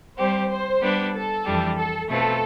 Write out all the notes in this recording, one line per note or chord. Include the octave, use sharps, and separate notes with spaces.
G3 C4 G4 C5
C5
G3 B3 D4 G4 B4
A4
F2 E3 G3 D4 G4
A4
B2 A3 C4 F4 A4 B4